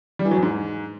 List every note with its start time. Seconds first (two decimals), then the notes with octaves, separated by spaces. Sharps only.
0.19 G3
0.25 E3
0.31 F#3
0.37 E2
0.43 G#2